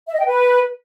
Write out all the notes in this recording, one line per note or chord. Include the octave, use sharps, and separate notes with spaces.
E5
D#5
G5
B4